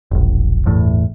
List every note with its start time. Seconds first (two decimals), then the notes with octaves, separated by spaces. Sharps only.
0.11 E1 A#1
0.65 G1 E2 A2